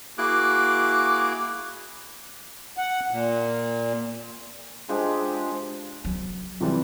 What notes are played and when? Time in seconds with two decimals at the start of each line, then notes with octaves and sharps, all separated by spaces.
0.18 A#3 E4 F#4 G#4 D6 F#6
2.77 F#5
3.11 A#2
4.88 F3 G#3 D4 G4
6.05 F#3
6.61 C3 E3 G3